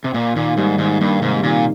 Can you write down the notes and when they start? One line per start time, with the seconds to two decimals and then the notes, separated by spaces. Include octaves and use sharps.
0.04 C3
0.14 A#2 A#3
0.36 A#2 D#3
0.57 G#2 G3
0.78 G#2 D#3
1.01 G2 A#3
1.22 G#2 C3
1.43 A#2 D#3